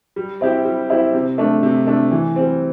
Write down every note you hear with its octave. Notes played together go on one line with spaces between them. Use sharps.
G3
C4 E4 G4
G3
C4 E4 G4
C3
A3 D4
C3
A3 D4
E3
G3 C4